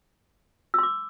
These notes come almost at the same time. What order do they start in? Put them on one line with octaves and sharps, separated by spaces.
E6 C6 D6